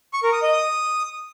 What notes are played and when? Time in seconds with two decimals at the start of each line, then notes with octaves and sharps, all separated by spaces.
0.13 C#6
0.23 A#4
0.33 D#6
0.42 D#5
0.52 D#6